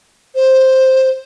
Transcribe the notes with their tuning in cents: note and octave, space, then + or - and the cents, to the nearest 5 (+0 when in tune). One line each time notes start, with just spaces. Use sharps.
C5 +5